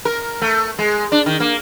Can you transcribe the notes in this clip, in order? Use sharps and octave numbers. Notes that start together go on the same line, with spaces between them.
A#4
A3
G#3
D4
D#3
A#3